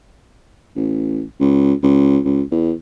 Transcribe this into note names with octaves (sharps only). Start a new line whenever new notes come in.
A1
C#2
C#2
C#2
E2